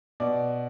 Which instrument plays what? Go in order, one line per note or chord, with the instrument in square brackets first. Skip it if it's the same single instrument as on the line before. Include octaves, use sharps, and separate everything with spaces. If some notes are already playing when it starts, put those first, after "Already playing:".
[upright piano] B2 D5